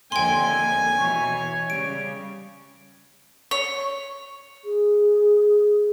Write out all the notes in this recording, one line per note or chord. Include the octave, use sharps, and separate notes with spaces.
D#2 D3 F3 G5 G#5 C6
B2 E3 C#5
C#3 G3 D7
C#5
G#4